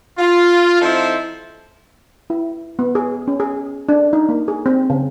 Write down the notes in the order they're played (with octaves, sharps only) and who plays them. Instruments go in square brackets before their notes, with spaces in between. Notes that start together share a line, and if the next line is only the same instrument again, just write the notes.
[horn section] F4
F3 C4 D#4 E4 A4 C5
[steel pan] E4
B3
G#4
C#4
G#4
D4
D#4
A#3
G#4
C4
C#3